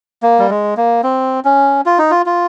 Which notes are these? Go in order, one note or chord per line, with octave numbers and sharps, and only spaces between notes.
A#3
G3
G#3
A#3
C4
C#4
F4
D#4
F4
F4